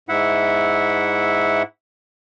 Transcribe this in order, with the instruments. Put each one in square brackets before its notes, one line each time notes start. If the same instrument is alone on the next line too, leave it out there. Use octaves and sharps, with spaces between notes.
[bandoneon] G#2 E4 E5 F#5